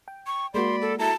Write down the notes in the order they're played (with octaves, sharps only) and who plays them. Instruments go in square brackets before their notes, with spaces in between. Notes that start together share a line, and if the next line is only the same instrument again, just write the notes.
[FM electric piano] G5
[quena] C#6
[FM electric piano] G#3 A#3 F#4 [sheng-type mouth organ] D5 B5 [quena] C6
[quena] A4
[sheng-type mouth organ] E4 A4 A#5 [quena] A5